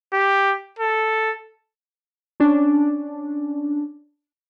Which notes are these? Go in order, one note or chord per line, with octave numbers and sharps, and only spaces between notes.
G4
A4
C#4 D4